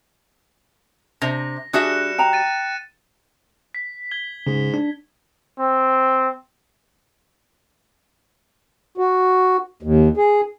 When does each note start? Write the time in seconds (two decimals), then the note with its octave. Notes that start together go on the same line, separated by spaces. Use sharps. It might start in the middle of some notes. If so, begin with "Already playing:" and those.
1.22 C3 D4 C5 A#6
1.73 G3 D4 F#4 G#4 E5 F#6 C#7 E7
2.18 G5 A#5
2.33 A6 D#7
3.75 B6
4.11 G#6 G7
4.47 G#2 C#3
4.74 D4
5.59 C4
8.98 F#4
9.83 D#2
10.17 G#4